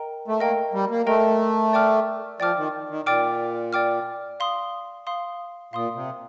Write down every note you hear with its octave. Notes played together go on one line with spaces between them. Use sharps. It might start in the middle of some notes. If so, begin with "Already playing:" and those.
Already playing: A#4 D#5 G5 A#5
A3
A#3 A#4 D#5 G5 A#5
G3
A#3
A3 A#4 D#5 G5 A#5
D5 G5 D6 F6
F3 D5 G5 D6 F6
D#3
D#3
A#2 D5 G5 D6 F6
D5 G5 D6 F6
F5 C6 D#6
F5 C6 D#6
A#2 F5 C6 D#6
C3